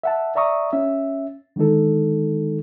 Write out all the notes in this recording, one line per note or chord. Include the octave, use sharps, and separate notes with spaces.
E5 F#5 A5
D5 E5 A#5 C#6 D#6
C#4 E5
D3 D#3 G#3 D#4 A4